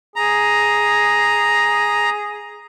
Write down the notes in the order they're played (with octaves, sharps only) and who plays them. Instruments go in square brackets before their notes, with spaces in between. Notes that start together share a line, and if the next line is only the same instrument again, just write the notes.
[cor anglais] G#4 [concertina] A#5